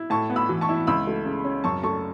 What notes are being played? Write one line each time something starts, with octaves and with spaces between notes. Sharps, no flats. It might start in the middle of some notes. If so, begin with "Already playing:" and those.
Already playing: E4
A2 A5 C#6
B3
B5 E6
E3
A5 C#6
E4
C#2 B5 E6
A3
C#3
C#4
F#2 A5 C#6
A3 A5 C#6